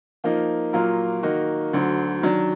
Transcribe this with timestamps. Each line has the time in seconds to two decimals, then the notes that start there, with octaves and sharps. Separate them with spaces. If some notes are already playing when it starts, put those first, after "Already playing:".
0.24 F3 A#3 D#4
0.73 A#2 F#3 A#3 F4 A#4
1.23 D#3 A#3 D#4 F#4
1.73 D2 D3 F#3
2.22 D#3 F#3 D4